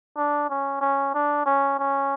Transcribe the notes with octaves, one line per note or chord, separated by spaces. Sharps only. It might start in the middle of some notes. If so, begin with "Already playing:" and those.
D4
C#4
C#4
D4
C#4
C#4